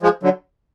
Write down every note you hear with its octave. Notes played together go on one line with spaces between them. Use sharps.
F3 G#3
D3 F#3